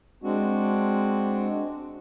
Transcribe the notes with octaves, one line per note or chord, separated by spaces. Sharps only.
G#3 C4 D4 F#4